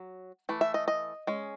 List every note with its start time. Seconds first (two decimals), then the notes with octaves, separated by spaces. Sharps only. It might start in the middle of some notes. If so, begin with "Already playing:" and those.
Already playing: F#3
0.49 E3 A3
0.61 E5
0.74 D#5
0.88 D#5
1.27 G#3 C#4